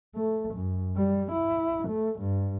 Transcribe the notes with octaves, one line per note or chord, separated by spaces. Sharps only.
A3
F#2
G3
E4
A3
G2